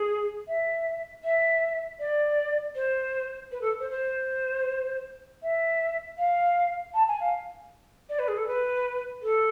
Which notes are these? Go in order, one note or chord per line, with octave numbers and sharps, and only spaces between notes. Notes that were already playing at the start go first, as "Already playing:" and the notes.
Already playing: G#4
E5
E5
D5
C5
B4
A4
C5
C5
E5
F5
A5
G#5
F5
D5
B4
G#4
A4
B4
A4